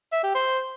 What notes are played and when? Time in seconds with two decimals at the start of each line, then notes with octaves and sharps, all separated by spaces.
0.12 E5
0.24 G4
0.35 C5